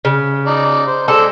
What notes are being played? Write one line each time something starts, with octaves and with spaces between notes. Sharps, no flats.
C#3
D#4 D5
C5
G#3 A4 C5 D5